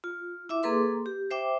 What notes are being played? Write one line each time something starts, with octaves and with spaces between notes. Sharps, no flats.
F4
E4 E5 D6
A#3 G#4 A4 B4 C6 D6
G4
C5 E5 G5 D6